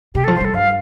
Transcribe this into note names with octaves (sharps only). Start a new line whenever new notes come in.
C3 G4
A4
F3
C5
G3 A4
G2 F5